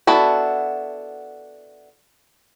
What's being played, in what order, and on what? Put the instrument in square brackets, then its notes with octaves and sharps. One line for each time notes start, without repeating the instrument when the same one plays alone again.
[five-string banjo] B3 D4 E4 F#4 A4